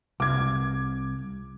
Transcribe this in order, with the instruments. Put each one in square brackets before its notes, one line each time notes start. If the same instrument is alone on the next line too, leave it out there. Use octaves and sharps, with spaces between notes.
[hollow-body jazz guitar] C2 [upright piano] D6 G#6